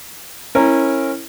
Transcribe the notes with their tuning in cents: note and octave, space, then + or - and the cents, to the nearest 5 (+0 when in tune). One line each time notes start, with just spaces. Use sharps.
C#4 -25 E4 +0 A#4 -10